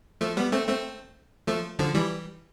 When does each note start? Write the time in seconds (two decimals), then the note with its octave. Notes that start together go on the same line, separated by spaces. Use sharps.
0.21 F3 A3
0.37 G3 B3
0.52 A3 C4
0.68 A3 C4
1.47 F3 A3
1.79 D3 F3
1.94 E3 G3